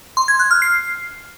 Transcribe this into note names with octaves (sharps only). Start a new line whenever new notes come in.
C6
G#6
F#6
F6
C7